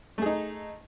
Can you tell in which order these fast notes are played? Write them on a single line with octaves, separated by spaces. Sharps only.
A3 G#4 D#4